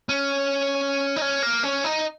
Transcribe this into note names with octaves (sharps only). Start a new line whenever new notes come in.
C#4
D#4
C#4
A#3
C#4
D#4